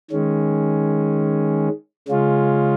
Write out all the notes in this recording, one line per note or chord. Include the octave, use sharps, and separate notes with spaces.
D#3 G#3 C#4
C#3 G#3 C#4 F4